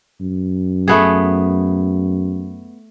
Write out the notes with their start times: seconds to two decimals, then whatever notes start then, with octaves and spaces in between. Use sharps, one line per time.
0.20 F#2
0.88 A3 B3 G#4